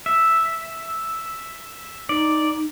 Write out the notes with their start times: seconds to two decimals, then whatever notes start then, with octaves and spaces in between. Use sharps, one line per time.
0.06 E5
2.09 D#4 D5